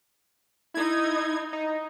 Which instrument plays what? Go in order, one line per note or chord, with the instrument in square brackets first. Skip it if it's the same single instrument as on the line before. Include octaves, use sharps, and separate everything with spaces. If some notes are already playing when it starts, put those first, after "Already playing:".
[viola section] D#4 [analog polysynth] E4 G#6
[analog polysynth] D#4